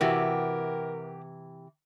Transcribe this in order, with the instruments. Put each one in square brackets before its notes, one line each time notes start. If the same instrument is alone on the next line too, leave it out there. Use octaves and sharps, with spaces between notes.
[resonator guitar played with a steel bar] C3 E3 [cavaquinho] F#4 G4 E5 [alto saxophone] A#4